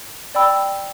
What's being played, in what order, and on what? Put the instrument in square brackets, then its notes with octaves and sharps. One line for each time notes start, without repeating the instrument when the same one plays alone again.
[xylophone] D5 G5 B5 E6